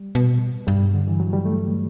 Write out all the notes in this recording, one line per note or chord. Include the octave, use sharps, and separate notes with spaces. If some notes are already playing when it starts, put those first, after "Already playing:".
Already playing: G3
B2
G2 G3
D3
E3
F#3
G3
A3